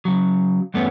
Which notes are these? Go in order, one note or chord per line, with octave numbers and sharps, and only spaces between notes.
C#3 F#3
E2 G2 A3 B3 C#4